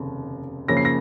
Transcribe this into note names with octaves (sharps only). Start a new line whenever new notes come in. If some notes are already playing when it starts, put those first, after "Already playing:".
Already playing: F1 D#2 C#3
F#2 C#3 F3 A#3 C#4 A#6
C7
A#6